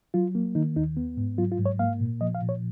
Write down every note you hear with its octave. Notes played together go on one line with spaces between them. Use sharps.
F#3 F4
A#3
D#3 D#4
D#2 D#4
B3
G#2
F#3 F4
F4
G#2
C#5
A#3 F5
A#2
F3 D#5
F5
A#2
C#5